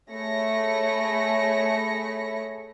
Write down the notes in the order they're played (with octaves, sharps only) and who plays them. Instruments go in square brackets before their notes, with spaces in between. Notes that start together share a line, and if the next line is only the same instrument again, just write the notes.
[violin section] A3 G#4 C#5 B5 A#6 C#7